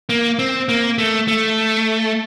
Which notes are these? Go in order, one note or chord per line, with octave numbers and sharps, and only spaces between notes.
A#3
C4
A#3
A3
A3